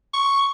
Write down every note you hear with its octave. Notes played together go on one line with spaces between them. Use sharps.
C#6